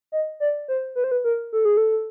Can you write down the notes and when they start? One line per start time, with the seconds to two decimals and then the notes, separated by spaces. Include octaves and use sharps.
0.12 D#5
0.40 D5
0.68 C5
0.96 B4
1.04 C5
1.11 B4
1.24 A#4
1.53 A4
1.65 G#4
1.77 A4